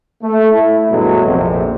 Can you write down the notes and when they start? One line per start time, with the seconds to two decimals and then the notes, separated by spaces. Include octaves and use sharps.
0.23 A3
0.53 E4
0.90 G2 B2 D3 F#3 G#3 A3
1.27 A#1 F2 C3